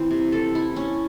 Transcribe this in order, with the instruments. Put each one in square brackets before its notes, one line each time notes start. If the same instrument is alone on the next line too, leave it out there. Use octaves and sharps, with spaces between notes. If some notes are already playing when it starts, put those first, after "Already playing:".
Already playing: [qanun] E3 C4
C3
A4
E4
C#4